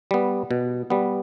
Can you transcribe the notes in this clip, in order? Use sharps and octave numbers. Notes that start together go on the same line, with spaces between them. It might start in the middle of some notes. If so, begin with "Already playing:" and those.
G3 B3
B2
G3 B3